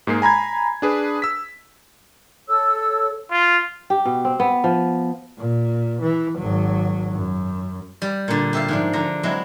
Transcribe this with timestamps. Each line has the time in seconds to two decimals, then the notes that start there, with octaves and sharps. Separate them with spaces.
0.07 G#2 G#3 A#3 C7
0.22 G#5 A#5 B5 G#6
0.82 D4 G#4 B4
1.22 E6 B6
2.48 A4 C#5 E6
3.32 F4
3.90 G4
4.05 B2
4.25 C4
4.40 B3
4.64 F3
5.39 A#2
6.02 E3
6.38 G#1 F#3
7.13 F#2
8.02 G3
8.28 A#2 D3
8.53 G4 E5 F5
8.68 G#2 F3 D4
8.93 D3 F3 A#5
9.23 F#3 G#3 C4 E4